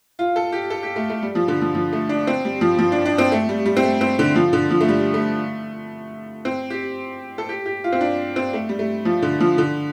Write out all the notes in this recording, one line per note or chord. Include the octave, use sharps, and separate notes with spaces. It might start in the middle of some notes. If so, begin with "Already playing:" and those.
F4
A4
G4
A4
G4
A3
A3
G3
F3
D3
F3
F3
A3
D4
C4
G3
F3
F3
D4
D4
C4
A3
G3
G3
C4
A3
C4
D3
F3
D3
F3
A3
G3
A3
C4
G4
A4
G4
G4
F4
C4
D4
C4
A3
G3
A3
F3
D3
F3
D3